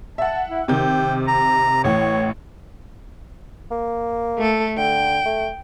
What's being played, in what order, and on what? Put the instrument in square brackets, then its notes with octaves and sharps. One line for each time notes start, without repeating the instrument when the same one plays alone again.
[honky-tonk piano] E5 F#5 [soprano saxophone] A5
[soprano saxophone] E4
[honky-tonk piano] C3 D#3 G6 [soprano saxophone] G5
[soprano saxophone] A#5
[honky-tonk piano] A1 A2 [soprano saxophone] C#5
[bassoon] A#3
[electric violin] A3 A4
[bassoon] D3 [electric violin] G5
[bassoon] A3